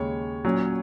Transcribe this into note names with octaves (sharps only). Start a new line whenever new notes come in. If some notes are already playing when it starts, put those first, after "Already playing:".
Already playing: D#2 C#3 G#3 C#5
A#2 F#3 C#4